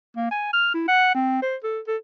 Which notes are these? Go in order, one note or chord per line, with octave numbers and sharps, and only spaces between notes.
A#3
G#5
F6
E4
F#5
C4
C5
A4
A4